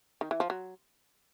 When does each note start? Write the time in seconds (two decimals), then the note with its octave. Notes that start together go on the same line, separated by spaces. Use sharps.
0.21 D#3
0.31 E3
0.40 F3
0.50 F#3